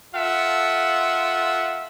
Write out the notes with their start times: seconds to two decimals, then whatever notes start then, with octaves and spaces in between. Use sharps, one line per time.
0.15 F4 A4 E5 F#5